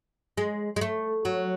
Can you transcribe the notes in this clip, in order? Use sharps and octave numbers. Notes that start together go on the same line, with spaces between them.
G#3
G#3
A3
F#3